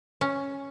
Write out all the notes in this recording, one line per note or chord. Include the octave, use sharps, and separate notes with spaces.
C#4